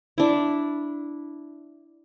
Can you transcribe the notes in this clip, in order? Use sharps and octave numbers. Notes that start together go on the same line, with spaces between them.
D4 E4